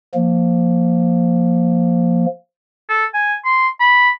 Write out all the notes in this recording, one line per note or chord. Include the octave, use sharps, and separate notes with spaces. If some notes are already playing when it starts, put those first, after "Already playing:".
F3 A#3
A4
G#5
C6
B5